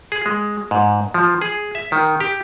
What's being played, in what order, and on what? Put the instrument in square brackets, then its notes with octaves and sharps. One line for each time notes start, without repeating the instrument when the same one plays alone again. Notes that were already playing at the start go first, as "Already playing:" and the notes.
[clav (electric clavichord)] G#4
G#3
G#2
F3
G#4
E5
D#3
G4